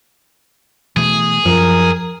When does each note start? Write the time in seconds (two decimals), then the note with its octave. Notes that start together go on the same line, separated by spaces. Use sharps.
0.96 B2 E3 A3 G#4
1.46 F#2 F3 A#4